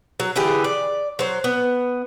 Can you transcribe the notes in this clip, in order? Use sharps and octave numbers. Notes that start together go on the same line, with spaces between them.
F#3
D3 E3 G4 G#4
D5
F#3 C5
B3